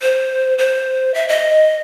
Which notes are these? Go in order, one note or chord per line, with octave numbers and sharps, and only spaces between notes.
C5
C5
E5
D#5